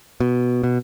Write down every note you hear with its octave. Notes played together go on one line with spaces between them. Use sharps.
B2
B2